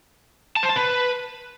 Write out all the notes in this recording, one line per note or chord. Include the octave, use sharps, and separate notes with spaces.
A5
C5
A5
B4